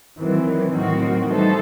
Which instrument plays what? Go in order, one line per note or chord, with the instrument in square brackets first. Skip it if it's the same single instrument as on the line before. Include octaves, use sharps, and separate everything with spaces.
[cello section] D#3 F#3 C4 [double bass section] E3
[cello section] A2 F#3 C4 F#4 [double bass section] D#3
[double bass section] E3 [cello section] G3 D#4 A4 C5